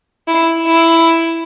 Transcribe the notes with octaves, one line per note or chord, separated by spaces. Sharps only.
E4
E4